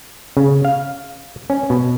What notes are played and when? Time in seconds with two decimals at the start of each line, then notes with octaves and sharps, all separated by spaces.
0.37 C#3
0.65 F5
1.50 C#4
1.70 B2